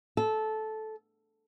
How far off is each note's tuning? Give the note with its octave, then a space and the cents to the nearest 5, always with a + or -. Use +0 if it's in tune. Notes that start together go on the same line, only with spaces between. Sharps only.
A4 -15